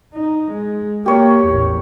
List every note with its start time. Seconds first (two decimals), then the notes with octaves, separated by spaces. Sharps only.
0.14 D#4
0.52 G#3
1.06 A#3 G4 C#5
1.47 A1 E2